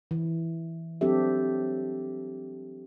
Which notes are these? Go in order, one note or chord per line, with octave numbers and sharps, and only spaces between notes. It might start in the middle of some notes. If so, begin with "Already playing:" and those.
E3
F#3 C4 D4 G4 A4 E5